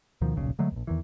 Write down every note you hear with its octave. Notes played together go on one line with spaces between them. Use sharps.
D2 B2 D#3 F3
D#1 B1 C#3
D3 F#3 G#3 A3
A#1 D#2
E2 D#3 E3